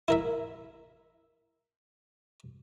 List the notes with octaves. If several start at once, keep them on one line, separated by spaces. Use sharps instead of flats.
E4 A#4 E5